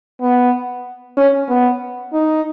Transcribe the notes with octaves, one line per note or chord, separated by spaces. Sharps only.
B3
C#4
B3
D#4